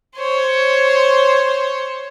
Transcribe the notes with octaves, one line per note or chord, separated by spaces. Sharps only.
C5 C#5